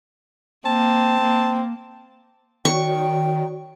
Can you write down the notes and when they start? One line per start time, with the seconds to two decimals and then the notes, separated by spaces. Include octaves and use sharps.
0.65 A#3 C4 A5
1.21 A#3
2.65 D#3 F#4 C#5 D5 G5 C#6